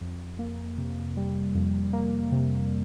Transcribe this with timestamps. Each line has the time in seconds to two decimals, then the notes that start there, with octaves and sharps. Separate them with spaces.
0.01 F2
0.39 A#3
0.78 C3
1.17 G3
1.55 F2
1.93 A#3
2.32 C3